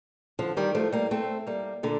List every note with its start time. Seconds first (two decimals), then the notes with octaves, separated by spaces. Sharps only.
0.39 D3 F3
0.57 D#3 G3
0.75 F3 A3
0.92 G3 A#3
1.11 A3 C4
1.47 G3 A#3
1.83 A#2 D3